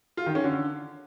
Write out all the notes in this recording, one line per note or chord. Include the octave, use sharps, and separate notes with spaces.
F4
D#3
C#4
D3